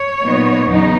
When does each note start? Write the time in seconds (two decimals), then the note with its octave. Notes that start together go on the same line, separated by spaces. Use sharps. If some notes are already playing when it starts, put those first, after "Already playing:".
Already playing: C#5
0.22 A#2 F#3 B3 D#4
0.67 E2 C#3 F#3 B3 D#4